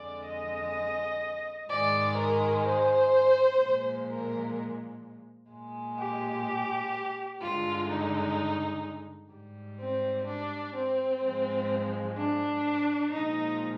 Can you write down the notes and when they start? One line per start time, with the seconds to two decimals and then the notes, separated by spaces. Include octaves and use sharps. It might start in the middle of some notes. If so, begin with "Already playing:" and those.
Already playing: F2 D3 G#3 D5
0.27 D#5
1.70 G#2 D#3 G#3 D5
2.17 A#4
2.65 C5
3.60 A#2 F3 G#3
4.08 A#4
5.51 A#2 G#3
5.98 G4
7.41 G2 D3 G#3 F4
7.89 D#4
9.31 G#2 G3
9.79 C4
10.27 D4
10.74 C4
11.23 G#2 F3 G#3
12.17 D4
13.13 A#2 F3 G#3 D#4